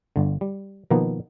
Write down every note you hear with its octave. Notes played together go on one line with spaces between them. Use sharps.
G1 D3
G3
B2 D#3 F3 A#3 B3 D#4